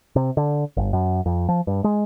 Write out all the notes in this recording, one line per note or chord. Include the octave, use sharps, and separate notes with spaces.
C3
D3
G1
F#2
F2
F3
G2
G#3